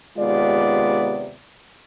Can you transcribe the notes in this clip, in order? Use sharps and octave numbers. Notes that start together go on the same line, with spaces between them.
D#2 C3 G#3 B3 F4 D5